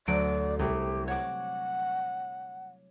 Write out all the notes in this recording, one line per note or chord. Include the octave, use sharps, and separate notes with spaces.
D2 F#3 D5 D7
C2 G4
C#5 F#5 D6